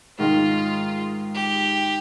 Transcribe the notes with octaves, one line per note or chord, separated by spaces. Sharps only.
G#2 D#3 G#3 D#4 F4
G4